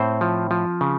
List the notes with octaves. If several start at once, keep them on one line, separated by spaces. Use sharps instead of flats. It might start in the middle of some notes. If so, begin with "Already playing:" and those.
Already playing: A2 C4 C5
F3
F3
C#3